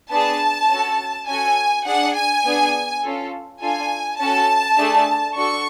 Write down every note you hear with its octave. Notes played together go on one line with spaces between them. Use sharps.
B3 D4 G#4 A5
C#4 F#4 A4
C#4 F#4 A4 G#5
D4 G#4 F#5
G#5
B3 D4 G#4
C#4 F4 A4
D4 F4 A4 G#5
C#4 F#4 A4 A5
A3 D4 G#4
D4 F#4 A4 C#6